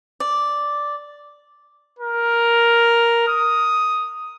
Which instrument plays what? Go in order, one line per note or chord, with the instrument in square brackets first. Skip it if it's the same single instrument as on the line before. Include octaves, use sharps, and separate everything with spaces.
[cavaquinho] D5
[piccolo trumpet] A#4
D#6